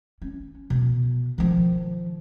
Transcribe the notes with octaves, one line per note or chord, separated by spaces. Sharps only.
C#4
B2
D#3 F3